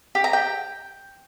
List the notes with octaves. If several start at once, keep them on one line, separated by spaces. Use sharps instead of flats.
G4
A#5
G5